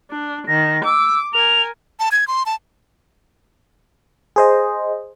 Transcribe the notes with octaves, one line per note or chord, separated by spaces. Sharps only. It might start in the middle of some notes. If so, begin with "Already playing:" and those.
D4
D#3 A#6
D6 E6
A#4 G#5 F7
A5
G#6
C6
A5
G#4 C5 D#5